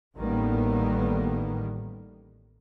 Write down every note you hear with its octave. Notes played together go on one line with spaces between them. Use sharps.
A1 A2 D#3 G3 A#3 B3